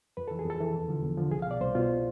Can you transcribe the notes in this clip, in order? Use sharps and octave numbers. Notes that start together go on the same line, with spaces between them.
F2 B4
E3 A4
G#4
F2 A4
E3
E2
D3 F3
E2
D3 F3
C2 G#4
F5
B2 D5
C2 C5
B2 F4